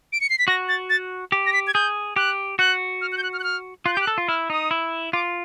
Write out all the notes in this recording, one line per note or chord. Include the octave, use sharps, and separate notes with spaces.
D7
C#7
C7
B6
F#4 A#6
A6
A6
G4
A#6
B6
G#6
G#4 G6
G4 F#6
F#4 F#6
F6
F#6
G6
F#6
F6
F#6
F6
F4 F#6
G6
G4 F#6
A4
F4
E4 F6
D#4 D#6
E4
F4 D6